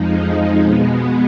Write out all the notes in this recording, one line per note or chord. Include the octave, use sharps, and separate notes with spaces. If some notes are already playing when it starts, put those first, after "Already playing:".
Already playing: F2 F3 G#3 D#4
B2 G#3 B3